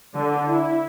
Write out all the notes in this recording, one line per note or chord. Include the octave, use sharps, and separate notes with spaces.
D3
E4